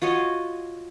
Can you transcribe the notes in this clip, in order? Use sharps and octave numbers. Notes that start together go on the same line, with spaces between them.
F4 F#4 C#5 D#5